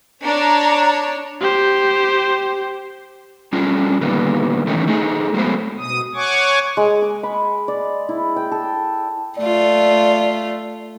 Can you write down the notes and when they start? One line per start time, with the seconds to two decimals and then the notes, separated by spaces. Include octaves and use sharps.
0.24 D4 C#5 A#5
1.40 G4 C5
3.53 G3 C#4 D4 F4
4.01 A#2 D3 D#3 G3 B3
4.67 D#3 E3 A3 C#4 D#4
4.87 A3 D#4 G#4
5.34 F#3 G#3 A3 B3 C5
5.78 B2 D#6
6.14 C#5 F#5 G#5 C#6 D6
6.77 G#3
7.02 D6
7.23 B5
7.68 D5
8.09 E4
8.36 G5
8.52 A4
9.38 A3 F4 D5